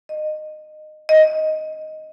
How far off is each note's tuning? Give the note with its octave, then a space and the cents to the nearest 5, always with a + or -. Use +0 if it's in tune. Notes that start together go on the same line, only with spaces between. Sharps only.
D#5 -20
D#5 +5